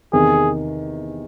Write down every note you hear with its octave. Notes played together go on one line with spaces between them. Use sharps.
E2 C3 D#3 G#4